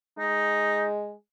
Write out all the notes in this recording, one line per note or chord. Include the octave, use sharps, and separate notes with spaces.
G#3 D#4